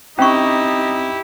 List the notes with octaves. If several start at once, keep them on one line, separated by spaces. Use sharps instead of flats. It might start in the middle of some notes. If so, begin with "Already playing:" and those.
C4 C#4 D#4 E4 G4 C#6